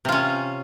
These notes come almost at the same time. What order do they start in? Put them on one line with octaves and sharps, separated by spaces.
C3 F4 C#4